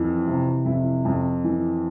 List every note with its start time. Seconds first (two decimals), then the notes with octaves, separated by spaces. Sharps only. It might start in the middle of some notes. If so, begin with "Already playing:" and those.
Already playing: F2 E3
0.27 C3
0.65 F2 E4
1.05 F2
1.44 E3